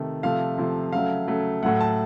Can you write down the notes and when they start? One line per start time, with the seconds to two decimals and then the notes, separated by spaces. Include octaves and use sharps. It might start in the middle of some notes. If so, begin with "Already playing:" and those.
Already playing: C3 D#3 A3
0.23 C3 F3 A3 F5
0.58 C3 F3 A3
0.92 C#3 F#3 A3 F5
1.28 C#3 F#3 A3
1.62 A2 F#3 A3 F#5
1.81 A5